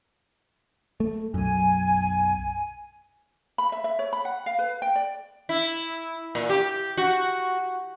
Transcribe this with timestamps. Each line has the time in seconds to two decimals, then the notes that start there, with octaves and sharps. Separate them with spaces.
1.00 A3
1.34 B1 F#2 G#5
3.58 B5
3.72 E5
3.84 E5
3.99 C#5
4.13 B5
4.25 F#5
4.46 F5
4.59 B4
4.82 G5
4.95 D5
5.49 E4
6.35 A#2
6.49 G4
6.97 F#4